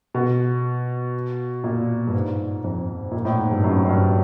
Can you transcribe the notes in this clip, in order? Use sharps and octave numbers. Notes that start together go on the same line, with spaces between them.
B2
A#2
G2
G#2
F2
A#2
A2
G#2
G2
F#2
F#2
G2